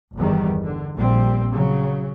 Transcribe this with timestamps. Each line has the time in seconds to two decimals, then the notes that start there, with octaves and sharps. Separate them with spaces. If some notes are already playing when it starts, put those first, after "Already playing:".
0.16 G1 E2 D#3 G3
0.64 D3
0.94 A#1 A#2 G3 C4
1.54 C#3 F#3